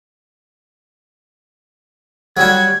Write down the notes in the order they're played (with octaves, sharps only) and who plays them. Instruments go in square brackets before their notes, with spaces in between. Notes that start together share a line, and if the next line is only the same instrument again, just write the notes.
[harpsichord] F#3 G3 F#4 [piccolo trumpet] G#6